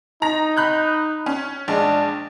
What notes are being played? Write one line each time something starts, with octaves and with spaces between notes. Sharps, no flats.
D#4 A#5 A#6
B5 F#6 G6
C#4
A#1 G#3 D4